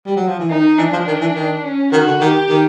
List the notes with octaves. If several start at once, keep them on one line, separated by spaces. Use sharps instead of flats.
G3
F#3
F3
E3
D#3 D#4
E3 D4
F3
D#3
E3
D#3
C#4
D#3 F#4
D3
D#3 G4
D#3